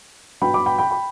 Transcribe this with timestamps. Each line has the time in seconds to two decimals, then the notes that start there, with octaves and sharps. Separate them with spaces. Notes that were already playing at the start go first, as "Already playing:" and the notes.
0.42 G2 F#3 B3 G5 B5
0.54 B5 D6
0.66 G5 B5
0.78 G5 B5
0.91 G5 B5